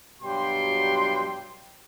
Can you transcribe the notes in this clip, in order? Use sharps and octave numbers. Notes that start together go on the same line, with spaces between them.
G2 B2 F#3 G3 G5 C6